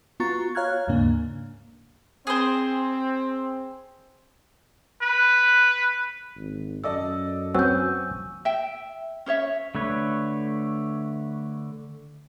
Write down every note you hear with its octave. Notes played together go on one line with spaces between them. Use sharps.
B3 F4 F#4 A#5 C#6 A6
C#5 F5 A#5 F6 F#6 G#6
D#2 G#2 C#3 A#3 D4
C4 G#4 C5
B4
G#1
F#2 A4 D5 D#5 E6
F#3 B3 C4 G#5 C#6 E6 G6
E5 G5
C#4 C5 C#5 E5
D3 A3 B4 C#5